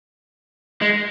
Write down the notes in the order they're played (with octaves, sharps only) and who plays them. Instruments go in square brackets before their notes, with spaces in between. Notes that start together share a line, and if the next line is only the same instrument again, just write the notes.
[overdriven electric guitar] G#3